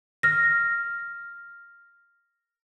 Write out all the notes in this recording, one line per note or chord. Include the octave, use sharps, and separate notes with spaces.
F6 A#6